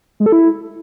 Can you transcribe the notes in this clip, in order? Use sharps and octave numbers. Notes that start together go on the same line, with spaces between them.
G#3
A4
E4